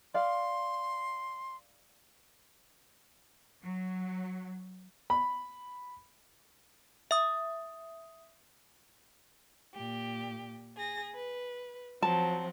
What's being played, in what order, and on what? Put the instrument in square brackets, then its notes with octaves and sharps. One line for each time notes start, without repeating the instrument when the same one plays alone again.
[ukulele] D5 F5 [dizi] C6
[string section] F#3
[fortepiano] B5
[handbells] E5 D#6
[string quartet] A#2 G4
G#4 A#6
B4
[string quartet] F3 F#3 C4 [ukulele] A5